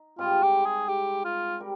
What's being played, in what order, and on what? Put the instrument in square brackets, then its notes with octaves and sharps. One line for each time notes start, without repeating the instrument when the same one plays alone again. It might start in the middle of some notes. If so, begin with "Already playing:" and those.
Already playing: [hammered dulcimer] D#4
[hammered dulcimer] G#2 G3 C4 [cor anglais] F4
[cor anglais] G4
G#4
G4
F4
[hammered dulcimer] G3 A#4